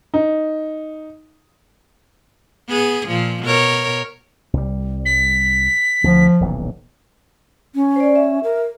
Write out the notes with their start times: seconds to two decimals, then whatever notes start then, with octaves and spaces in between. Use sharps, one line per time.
0.14 D#4
2.69 B3 G#4
3.08 A#2 F3
3.43 B2 A#4 C#5
4.53 C2 G3
5.06 B6
6.04 D2 F3
6.41 D#1 B1 E3
7.75 C#4
7.96 C5 D5
8.16 E5
8.44 A#4